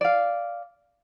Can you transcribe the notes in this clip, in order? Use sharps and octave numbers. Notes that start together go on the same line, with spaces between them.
D5 F5